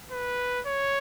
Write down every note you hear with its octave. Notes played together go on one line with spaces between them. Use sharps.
B4
C#5